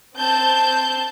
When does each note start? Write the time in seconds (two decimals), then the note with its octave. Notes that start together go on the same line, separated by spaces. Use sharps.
0.18 C4 A5 G6